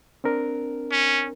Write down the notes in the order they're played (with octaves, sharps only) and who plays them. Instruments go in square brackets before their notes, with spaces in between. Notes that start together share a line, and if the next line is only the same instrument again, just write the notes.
[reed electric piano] C4 D4 A#4
[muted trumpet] C#4